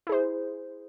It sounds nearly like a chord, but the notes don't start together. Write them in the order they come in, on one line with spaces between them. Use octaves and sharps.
E4 G#4 C5